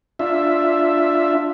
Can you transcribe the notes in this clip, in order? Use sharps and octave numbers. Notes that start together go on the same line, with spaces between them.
D4 F4 E5